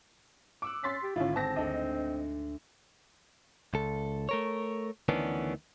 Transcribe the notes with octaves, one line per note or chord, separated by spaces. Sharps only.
C#6 D6 E6 F#6
C#4 C6 A6 B6
G4
G#1 D3 C#4 E4 F4
C4 A5 A#6
D2 D4 D#5
C#2 A4
A3 A#4 C#5
D2 D#3 E3 B3 C#4 D4